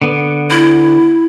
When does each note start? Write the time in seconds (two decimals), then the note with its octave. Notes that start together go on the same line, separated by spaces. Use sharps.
0.02 D3 B3
0.50 E4